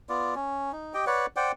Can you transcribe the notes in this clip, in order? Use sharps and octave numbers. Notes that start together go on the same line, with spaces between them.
B3 F4 D5
C#4
D#4
G4 D#5 G5
B4 C#5 D5 F#5
C5 D5 F#5 G5